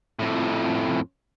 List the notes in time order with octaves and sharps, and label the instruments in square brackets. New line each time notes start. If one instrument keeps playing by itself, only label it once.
[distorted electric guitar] F2 A2